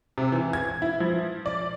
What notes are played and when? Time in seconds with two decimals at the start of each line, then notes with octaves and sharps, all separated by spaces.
0.18 C3
0.32 E3
0.53 G#6
0.82 E4
1.00 F3
1.46 D5